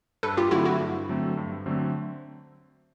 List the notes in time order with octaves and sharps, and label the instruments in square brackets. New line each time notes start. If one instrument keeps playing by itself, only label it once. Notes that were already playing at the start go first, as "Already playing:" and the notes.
[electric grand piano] G2 [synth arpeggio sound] A4 B4
[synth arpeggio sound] F4 G4
[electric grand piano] D3 F#3 A3 C4 [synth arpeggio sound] E4 F#4
[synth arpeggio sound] E4 F#4
[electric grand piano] G2
D3 F#3 A3 C4
G2
D3 F#3 A3 C4